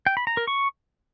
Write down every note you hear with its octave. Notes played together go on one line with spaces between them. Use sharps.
G5
B5
A#5
A#4
C#6